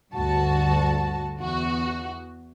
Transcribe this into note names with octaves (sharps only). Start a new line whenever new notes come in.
D2 G2 F#4 A5
E2 F#4